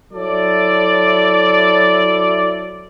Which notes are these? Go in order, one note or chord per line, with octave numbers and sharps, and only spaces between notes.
F#3 E4 A4 D5